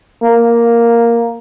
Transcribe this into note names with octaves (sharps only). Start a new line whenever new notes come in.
A#3